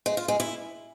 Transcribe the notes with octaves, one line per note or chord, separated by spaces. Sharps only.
G#3
F4
G#3
E4